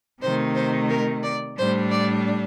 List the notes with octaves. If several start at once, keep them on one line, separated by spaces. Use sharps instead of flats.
C3 D#3 A3 C5
C5
A#4
D5
A2 G3 D4 C5
D5